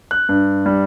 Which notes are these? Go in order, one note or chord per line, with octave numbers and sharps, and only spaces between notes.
F#6
G2
G3